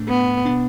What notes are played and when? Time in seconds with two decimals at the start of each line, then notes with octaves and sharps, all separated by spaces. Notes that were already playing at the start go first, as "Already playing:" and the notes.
Already playing: A2 A3 D4
0.09 B3
0.45 B2 B3 D4